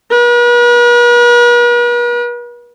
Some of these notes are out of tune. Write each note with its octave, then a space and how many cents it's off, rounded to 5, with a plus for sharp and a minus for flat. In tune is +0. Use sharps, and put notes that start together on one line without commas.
B4 -45